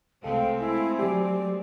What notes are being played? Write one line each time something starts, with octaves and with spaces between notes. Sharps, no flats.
C2 G#3 A3 C4 A4 F5 G5
E4 G#5
F#3 G4 D5